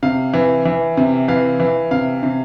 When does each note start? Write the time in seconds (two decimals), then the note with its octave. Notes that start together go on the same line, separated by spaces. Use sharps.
0.03 C3 F5
0.34 E3
0.65 E3
0.97 C3
1.28 E3 F5
1.60 E3
1.91 C3 F5
2.23 C3